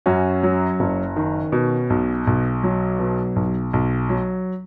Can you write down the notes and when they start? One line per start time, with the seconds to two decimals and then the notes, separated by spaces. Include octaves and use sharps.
0.06 F#2 C#4 F#4
0.43 F#3
0.80 F#1
1.16 D#3
1.52 B2
1.90 B1
2.27 B1
2.64 F#3
2.99 B2
3.36 B1
3.73 B1
4.09 F#3